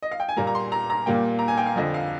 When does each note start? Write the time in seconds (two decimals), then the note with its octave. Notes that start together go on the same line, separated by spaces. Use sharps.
0.02 D#5
0.11 F5
0.20 G5
0.29 G#5
0.37 A#2 G3 A#3 A#5
0.47 A#5
0.55 C6
0.72 A#5
0.90 A#5
1.06 A#2 G3 A#3 G5
1.39 A#5
1.48 G#5
1.58 G5
1.66 F5
1.76 F2 D3 F3 D#5
1.94 F5